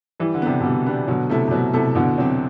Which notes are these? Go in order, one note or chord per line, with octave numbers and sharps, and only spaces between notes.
E3 G3
D3
C3 B3 D4 G4
B2 D3 G3
B3 D4 G4
B2 D3 F#3
C3 A3 E4 A4
C3
B2 F#3
C3 A3 E4 A4
E2 B2 D3
C3 F#3 C4